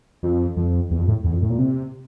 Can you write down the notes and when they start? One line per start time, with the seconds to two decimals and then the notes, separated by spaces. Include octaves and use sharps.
0.23 F2
0.57 F2
0.91 E2
0.99 F2
1.08 A2
1.24 E2
1.33 F2
1.42 A2
1.50 A#2
1.59 C3